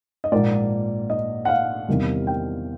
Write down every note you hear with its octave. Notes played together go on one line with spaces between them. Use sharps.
D#5
A#1 G#2 F3 A#3 D5
D#5
F#5
F5
E2 C3 D#3 G3
G5